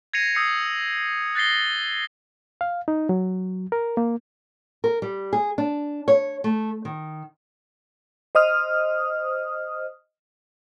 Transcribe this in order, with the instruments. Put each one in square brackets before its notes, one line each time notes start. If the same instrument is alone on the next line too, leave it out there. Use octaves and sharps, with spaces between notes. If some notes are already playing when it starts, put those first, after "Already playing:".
[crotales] G#6 A#6 C7 C#7 D#7 F7
D#6 E6 G6 C7 C#7
F#6 A6 A#6 C7 G7
[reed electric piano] F5
D#4
F#3
A#4
A#3
[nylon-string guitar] A#4
G3
G#4
D4
C#5
A3
D#3
[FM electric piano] C5 D#5 D#6 F6